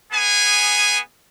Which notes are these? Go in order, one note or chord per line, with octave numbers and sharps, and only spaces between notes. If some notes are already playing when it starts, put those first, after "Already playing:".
B3 G#4 G#5